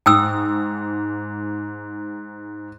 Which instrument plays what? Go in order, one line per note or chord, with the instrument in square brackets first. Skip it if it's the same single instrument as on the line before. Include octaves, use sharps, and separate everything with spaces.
[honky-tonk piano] G#2 [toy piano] G5 D#6 E6